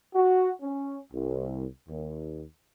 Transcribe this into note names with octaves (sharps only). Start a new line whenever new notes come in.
F#4
C#4
C2
D#2